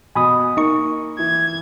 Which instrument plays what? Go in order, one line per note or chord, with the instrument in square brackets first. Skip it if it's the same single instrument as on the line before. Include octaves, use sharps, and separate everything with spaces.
[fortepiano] B2 [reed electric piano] G#5 B5 D#6
[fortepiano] A#3 [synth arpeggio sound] D#4 C#6
[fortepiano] E3 [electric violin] G#6